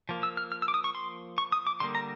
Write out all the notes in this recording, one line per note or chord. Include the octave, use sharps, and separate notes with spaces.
F3 A#3
E6
F6
F6
E6
D6
D#6
C#6
C6
C#6
D#6
D6
D3 G3 A#3 C6
A#5